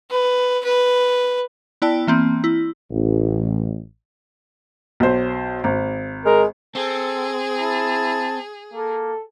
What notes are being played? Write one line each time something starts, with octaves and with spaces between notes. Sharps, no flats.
B4
B4
B3 E4 D5 G5 A5
E3 A#3 C4
E4
A1
B1 C5
G#1
G#3 A#4
C4 G#4 A4
E4 A5
A#3 A4